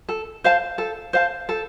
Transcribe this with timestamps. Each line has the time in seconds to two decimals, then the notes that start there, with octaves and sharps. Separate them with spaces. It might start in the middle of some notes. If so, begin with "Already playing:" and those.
0.09 A4
0.44 C5 F5 A5
0.78 A4
1.13 C5 F5 A5
1.49 A4